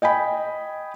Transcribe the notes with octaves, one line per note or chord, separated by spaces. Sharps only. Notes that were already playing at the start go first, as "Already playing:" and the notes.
D#5 G5 G#5 B5